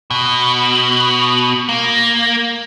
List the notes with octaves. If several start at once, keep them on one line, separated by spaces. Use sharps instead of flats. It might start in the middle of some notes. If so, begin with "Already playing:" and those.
B2
A#3